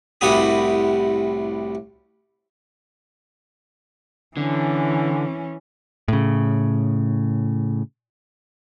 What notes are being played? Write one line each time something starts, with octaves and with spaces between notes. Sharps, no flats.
C2 A2 F#4 G4 B5 D#6
D3 E3 C#4
A2 C#3